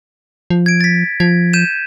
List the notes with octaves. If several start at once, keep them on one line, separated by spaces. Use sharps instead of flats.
F3
G#6 D7
A6 B6
F3 G#6
G6 D#7 E7